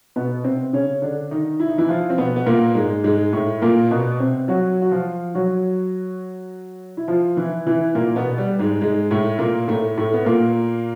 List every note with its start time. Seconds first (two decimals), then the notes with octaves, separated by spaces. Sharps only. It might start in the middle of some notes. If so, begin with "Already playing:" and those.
0.16 B2 B3
0.44 C3 C4
0.73 C#3 C#4
1.02 D3 D4
1.31 D#3 D#4
1.60 E4
1.69 D#4
1.78 E3 E4
1.89 F3 F4
2.10 C4
2.18 B2 B3
2.36 B3
2.46 A#2 A#3
2.75 G#2 G#3
3.04 G#2 G#3
3.33 A2 A3
3.62 A#2 A#3
3.91 B2 B3
4.20 C3 C4
4.48 F#3 F#4
4.82 F#4
4.91 F3 F4
5.35 F#3 F#4
6.97 E4
7.08 F3 F4
7.37 E3 E4
7.67 E3 E4
7.95 A#2 A#3
8.16 B2 B3
8.38 G3
8.59 G#2 G#3
8.81 G#2 G#3
9.11 A2 A3
9.39 A#2 A#3
9.68 A2 A3
9.98 A2 A3
10.14 B3
10.26 A#2 A#3